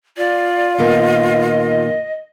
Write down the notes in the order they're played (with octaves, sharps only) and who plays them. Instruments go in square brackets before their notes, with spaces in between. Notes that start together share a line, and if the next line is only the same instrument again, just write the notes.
[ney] F4 [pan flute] D5
[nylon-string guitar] A#2 D#3 B3 [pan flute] D#5